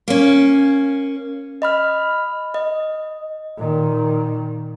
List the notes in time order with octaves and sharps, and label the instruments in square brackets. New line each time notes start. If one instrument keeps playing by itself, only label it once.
[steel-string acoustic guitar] A#3 C#4
[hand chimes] D#5 B5 F6
D#5
[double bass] A#2 D#3